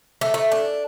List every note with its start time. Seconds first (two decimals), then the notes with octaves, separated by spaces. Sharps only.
0.21 A3
0.34 A3
0.52 D4